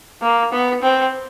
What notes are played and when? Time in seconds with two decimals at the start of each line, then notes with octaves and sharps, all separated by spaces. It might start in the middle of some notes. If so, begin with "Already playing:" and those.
0.22 A#3
0.52 B3
0.82 C4